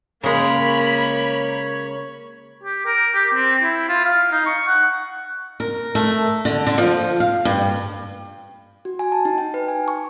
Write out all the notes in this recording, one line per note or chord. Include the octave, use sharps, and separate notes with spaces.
C#3 G#3 A#3 A#4 C#5 B5
G4
A#4
G4
C4
E4
F4
F5
D#4
C#6
F#5
A#4
A3
D3
D3
F3
F5
G2
F#4
G#5
A5
D#4
G5
B4
G#5
C#6